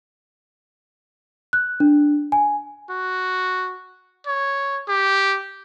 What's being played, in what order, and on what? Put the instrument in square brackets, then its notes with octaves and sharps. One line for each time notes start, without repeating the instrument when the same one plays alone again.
[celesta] F#6
D4
G#5
[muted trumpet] F#4
C#5
G4